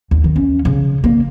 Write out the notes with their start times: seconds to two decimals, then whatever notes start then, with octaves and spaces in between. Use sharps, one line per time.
0.11 D#2
0.24 D#3
0.36 C#4
0.65 C#3
1.04 A#3